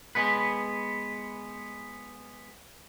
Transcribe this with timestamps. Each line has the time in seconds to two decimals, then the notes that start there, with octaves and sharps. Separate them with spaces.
0.15 G#3 B3 B4